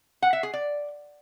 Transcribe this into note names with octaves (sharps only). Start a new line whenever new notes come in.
F#5
E5
G#4
D5